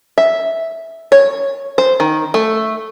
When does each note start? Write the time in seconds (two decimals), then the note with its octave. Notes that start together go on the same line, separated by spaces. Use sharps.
0.18 E5
1.12 C#5
1.78 C5
2.00 D#3
2.34 A3